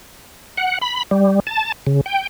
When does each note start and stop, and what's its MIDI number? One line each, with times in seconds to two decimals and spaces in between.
0.58 0.79 78
0.81 1.03 83
1.11 1.40 55
1.47 1.72 81
1.87 2.01 49
2.06 2.27 79